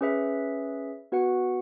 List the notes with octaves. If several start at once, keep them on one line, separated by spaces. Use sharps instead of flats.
C#4 G#4 B4 E5
B3 F#4 B4 F#5